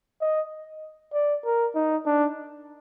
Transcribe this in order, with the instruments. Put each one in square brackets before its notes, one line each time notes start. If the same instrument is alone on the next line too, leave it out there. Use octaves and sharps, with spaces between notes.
[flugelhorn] D#5
D5
A#4
D#4
D4